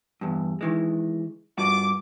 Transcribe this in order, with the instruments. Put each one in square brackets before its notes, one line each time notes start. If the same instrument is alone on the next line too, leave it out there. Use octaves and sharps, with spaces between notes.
[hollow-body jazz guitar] E2 G2
D#3 E3 G#3
[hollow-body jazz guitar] G2 F4 F#4 [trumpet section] D6